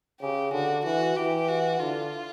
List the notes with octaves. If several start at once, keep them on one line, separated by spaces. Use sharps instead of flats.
C#3 G4
D3 F#4
E3 F#4
E3 G4
F#4
D3 F4